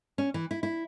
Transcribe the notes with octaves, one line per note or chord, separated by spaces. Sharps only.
C#4
E3
E4
E4